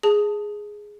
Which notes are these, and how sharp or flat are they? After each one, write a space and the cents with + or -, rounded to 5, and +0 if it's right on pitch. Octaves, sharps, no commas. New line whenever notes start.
G#4 +0 A5 +0